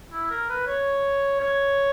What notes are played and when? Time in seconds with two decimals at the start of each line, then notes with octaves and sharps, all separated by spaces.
0.12 E4
0.31 A#4
0.49 B4
0.67 C#5
1.41 C#5